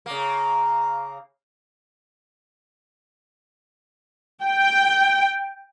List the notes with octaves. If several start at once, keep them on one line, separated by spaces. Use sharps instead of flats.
C#3 A#3
G5